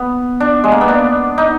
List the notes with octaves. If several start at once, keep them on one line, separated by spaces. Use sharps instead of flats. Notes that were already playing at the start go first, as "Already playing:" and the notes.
Already playing: B3
D4
G#3
A#3
B3
D4
D#4